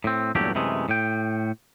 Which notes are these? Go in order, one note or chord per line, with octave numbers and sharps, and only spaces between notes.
A2 C4
E2 G2 A#2 F#3 A3 G4
F#2 C3 E3 G#3 A3
A2 G5